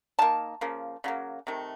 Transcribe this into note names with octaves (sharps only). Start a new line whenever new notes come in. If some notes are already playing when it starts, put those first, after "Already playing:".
D#3 A#3 A5
C#3 F3 A#3
C#3 F#3 A#3
C3 D#3 A3